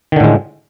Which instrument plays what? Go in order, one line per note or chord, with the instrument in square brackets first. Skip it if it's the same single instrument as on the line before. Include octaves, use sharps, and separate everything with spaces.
[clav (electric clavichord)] D#3
D3
A2
G#3